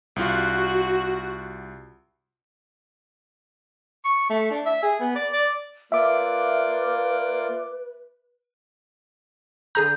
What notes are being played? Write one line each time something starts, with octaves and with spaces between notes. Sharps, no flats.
C2 F4 F#4
C#6
A3
D4
E5
G#4
B3
D5
D5
A#3 F4 B4 D5 E5 D6
D3 G#4 A#5 G6